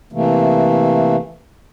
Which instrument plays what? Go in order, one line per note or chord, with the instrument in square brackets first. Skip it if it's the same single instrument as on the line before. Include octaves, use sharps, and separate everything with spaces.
[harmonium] C3 E3 A3 A#3